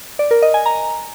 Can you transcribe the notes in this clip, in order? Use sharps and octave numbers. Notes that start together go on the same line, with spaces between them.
D5
A#4
D#5
G#5
A#5